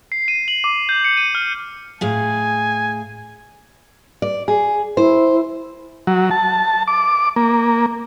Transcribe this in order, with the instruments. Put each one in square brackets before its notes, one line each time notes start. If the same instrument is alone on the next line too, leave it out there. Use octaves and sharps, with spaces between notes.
[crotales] C7
D#7
F#7
D6
G6
C#7
D#7
F6
[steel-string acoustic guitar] A2 G#4 F5 [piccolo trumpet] G#5
[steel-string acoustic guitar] D5
G#4
[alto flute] E4 [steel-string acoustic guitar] C5
[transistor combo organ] F#3
A5
D6
A#3